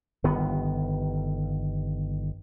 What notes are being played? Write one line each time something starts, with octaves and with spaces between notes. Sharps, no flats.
G1 D#3 B3